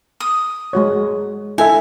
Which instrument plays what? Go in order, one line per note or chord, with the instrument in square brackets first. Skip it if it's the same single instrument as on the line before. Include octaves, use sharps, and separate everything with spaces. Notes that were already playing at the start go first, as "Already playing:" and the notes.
[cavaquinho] D#6
[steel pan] G#3 F#4 C#5
[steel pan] E4 A4 E5 [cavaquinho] G#5